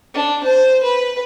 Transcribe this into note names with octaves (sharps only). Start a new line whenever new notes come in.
D4
C5
B4